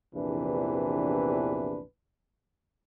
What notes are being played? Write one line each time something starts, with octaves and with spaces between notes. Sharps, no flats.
A#1 E2 C3 E3 D4 B4